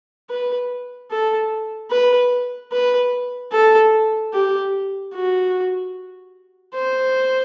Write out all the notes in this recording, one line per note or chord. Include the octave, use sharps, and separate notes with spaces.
B4
A4
B4
B4
A4
G4
F#4
C5